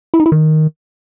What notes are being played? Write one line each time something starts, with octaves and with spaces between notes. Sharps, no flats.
E4
D#4
E4
D#3